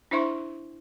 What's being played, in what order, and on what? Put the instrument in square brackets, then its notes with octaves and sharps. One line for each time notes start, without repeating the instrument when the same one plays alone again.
[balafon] D4 E4 C5 E5 C6 C#6